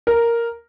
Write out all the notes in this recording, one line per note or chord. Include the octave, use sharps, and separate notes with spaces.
A#4